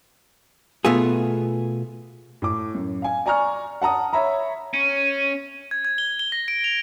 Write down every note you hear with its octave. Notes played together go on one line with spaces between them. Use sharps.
B2 A3 B3 F4 G#4
A2 D6
F#2
F5 G#5
D5 G#5 A#5 C#6 F6
F#5 A5 A#5 D#6
C#5 E5 A#5 B5
C#4
G#6
G#6
G7
G7
A#6
D7
F7